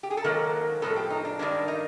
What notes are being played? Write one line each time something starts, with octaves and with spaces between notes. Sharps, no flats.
G4
G#4
A4
G#2 D#3 F#3 A#3 A#4
A2 F3 G#3 B3 A4
G4
D#4
D4
G2 D#3 G3 A#3 D4
D#4